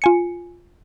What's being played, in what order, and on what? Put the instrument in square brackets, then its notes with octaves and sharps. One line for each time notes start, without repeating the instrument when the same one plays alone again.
[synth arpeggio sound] F4 G#5 C#7